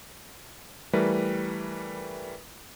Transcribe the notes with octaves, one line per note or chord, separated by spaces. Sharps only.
E3 G3 A3 A#4 B4